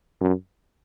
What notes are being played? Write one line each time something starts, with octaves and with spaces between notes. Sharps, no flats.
F#2